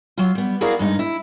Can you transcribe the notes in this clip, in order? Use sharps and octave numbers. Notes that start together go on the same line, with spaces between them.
F#3 F4
G3 B3
E4 F#4 G#4 A#4 D5 F5
G2 G#3 D#4
E4